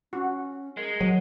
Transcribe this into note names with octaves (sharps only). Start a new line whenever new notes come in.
C#4 F#4
G#3 A#4
F#3